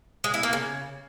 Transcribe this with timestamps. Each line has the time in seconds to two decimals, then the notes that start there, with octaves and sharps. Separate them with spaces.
0.24 G#3
0.34 E4
0.43 A#3
0.53 C#3